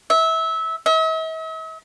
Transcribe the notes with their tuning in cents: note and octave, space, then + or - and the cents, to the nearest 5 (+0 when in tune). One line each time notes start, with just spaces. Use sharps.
E5 -20
E5 -45